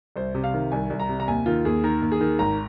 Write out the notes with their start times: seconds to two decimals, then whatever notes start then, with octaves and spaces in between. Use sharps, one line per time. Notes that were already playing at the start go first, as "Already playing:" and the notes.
0.16 C2 C5
0.34 C3
0.44 F5
0.54 D#3
0.72 C2 G#5
0.90 C2
0.99 A#5
1.09 C3
1.20 A#5
1.28 D#2 G#5
1.46 D#3 F4
1.65 D#2 G#4
1.84 D#3 A#4
2.02 D#2
2.12 G#4
2.21 D#3
2.39 G#1 A#5